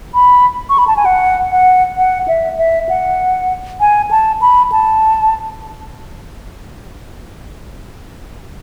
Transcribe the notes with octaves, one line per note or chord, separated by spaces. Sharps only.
B5
C#6
B5
A5
G#5
F#5
F#5
F#5
E5
E5
F#5
G#5
A5
B5
A5